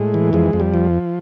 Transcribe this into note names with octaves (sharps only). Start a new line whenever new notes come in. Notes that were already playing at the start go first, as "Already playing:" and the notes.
Already playing: A2 G#3
E3
F2 G#3
F2
G3
F3